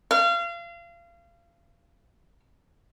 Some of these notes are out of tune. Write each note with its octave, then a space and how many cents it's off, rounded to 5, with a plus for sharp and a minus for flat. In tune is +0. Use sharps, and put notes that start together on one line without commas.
F5 -30